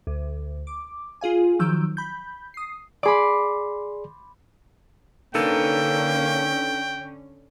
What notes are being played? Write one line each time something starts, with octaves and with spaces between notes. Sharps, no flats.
D2
D6
F4 G#4 F5 G#5
D#3 F3 F#3 E6 G6 D7
B5 G6
D#6 C7
G#4 D5 B5 C6 D6
D3 A#3 C#4 D#4 A4 B4 G5